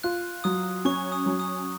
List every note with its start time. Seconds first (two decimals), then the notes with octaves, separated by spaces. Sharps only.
0.03 F4 F#6
0.44 F#3 D#6
0.85 C#4 C#6
1.12 D#6
1.26 F#3
1.40 D#6